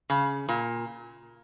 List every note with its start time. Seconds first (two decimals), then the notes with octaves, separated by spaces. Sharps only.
0.10 C#3
0.49 A#2